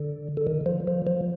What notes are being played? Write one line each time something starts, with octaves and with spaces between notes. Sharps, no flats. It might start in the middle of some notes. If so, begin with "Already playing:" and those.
Already playing: D3
D3
D#3
F3
F3
F3